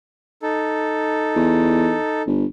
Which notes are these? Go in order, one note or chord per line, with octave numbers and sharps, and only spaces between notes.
D#4 A4
E2
G1